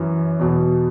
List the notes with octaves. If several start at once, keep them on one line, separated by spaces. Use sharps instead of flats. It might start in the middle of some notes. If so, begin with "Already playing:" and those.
Already playing: F#2 E3
E2 B2